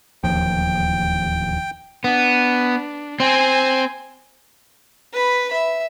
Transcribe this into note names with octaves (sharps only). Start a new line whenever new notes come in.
D1 D#2 F3 G5
B3 D4
C4 C5 G#5
B4 B5
E5